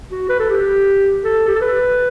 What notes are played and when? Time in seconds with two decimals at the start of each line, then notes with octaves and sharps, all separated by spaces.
0.12 F#4
0.29 B4
0.40 A4
0.50 G4
1.24 A4
1.48 G4
1.55 A4
1.61 B4